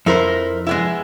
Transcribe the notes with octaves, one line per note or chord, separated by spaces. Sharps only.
F2 E4 A#4 C5
G#3 B3 E4